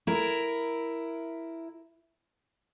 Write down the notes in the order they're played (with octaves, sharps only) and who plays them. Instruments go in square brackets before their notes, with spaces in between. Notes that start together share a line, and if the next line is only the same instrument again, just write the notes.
[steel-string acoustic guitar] E4 A#4